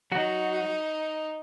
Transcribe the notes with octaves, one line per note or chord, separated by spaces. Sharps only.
F#3 D#4 F#4